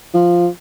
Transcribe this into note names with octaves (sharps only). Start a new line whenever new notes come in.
F3